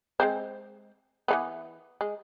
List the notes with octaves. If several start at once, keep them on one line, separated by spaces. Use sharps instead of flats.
G#3 C4 C5
E3 A#3 B3
G#3